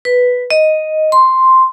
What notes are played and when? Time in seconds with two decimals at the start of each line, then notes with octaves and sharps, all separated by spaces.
0.05 B4
0.51 D#5
1.12 C6